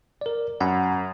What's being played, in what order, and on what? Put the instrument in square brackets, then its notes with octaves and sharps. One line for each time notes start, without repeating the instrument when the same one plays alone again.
[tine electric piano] A#4 D5
[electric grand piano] F#2 [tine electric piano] F#5 B5